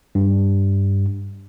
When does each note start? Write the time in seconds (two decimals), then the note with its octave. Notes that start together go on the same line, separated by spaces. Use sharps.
0.15 G2